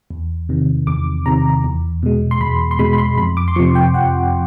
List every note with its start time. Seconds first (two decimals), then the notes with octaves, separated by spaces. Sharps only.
0.10 E2
0.49 C3 D#3
0.87 E2 D6
1.26 C3 D#3 A#5
1.64 E2
2.03 B2 G#3
2.31 C6
2.40 E2 B5
2.71 C6
2.79 B2 G#3 B5
2.93 B5
2.98 C6
3.18 F2 B5
3.37 D6
3.48 C6
3.56 C3 F3 C#6
3.75 G5
3.94 F2 F#5